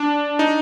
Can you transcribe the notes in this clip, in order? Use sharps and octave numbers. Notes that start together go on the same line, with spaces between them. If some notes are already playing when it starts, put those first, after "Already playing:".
Already playing: D4
D#4